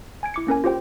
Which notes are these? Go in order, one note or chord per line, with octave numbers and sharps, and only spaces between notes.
G#5 G#6 D7
E4 D6 C#7
A#3 C#4 A#4 G#5
F4 G4 C5 G5